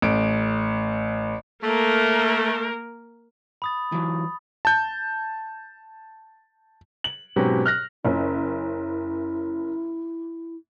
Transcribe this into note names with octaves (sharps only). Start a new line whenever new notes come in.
A1 D7
A3 A#3 A#4
B5 D#6 A6
E3 F#3
A5 G6
F#7
G#2 B2 F#3 C4 C#4 G4
F6 F#6 A#6
F#1 C#4 E4